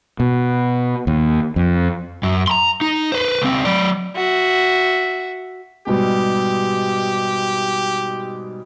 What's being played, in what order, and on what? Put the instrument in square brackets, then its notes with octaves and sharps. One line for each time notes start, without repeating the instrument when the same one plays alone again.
[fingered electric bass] B2
D#2
F2
[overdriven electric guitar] F#2
A#5 C6
D#4
B4 C5
C#2 C4
F#3 D5
[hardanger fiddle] F#4 E5
[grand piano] G#2 B2 G3 [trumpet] G4